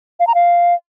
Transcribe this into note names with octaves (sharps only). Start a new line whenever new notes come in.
F5
A#5
F5